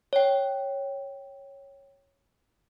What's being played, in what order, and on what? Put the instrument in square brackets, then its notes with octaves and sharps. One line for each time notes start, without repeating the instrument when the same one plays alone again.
[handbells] C#5 G5